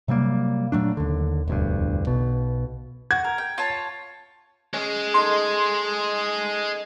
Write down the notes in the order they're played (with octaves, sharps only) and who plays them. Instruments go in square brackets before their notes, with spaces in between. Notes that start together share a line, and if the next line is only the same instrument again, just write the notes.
[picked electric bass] C3 F#3 G3 A#3
A#2 F#3 A3 D4
D#2 D3
E1 D2 G2
B1 B2
[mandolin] F#4 [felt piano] G#6
[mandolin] A#4
G5
F4 C#5 A5
[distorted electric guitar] G#3 [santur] C#4
[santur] D#4 A4 D#5 [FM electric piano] C6